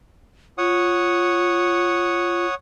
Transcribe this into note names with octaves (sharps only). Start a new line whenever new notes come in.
F4 C#5 F#5 D#6